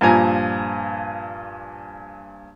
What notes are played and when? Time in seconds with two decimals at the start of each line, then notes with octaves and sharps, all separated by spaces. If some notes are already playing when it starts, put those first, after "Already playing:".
0.01 G2 A#2 F3 G#5 A#5